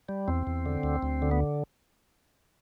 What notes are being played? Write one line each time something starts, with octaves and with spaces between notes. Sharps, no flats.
G3
E2 C4
E2
D3
D2
D2
D3
B3